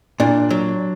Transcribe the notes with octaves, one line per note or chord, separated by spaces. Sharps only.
A#2 D4
F#3